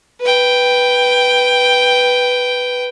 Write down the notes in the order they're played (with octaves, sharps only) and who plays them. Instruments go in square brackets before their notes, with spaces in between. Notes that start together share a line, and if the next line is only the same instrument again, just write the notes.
[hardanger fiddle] B4 G5